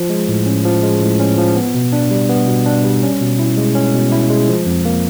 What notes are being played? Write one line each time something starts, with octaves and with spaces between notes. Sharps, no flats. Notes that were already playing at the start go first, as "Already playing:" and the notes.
Already playing: F3
G#3
A2
C#4
F3
G#3
A2
C#4
F3
B3
B2
D4
G3
B3
B2
D4
G3
C#4
B2
E4
G#3
C#4
B2
E4
G#3
F3
F2
A#3